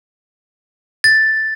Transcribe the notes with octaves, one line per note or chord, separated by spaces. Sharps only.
A6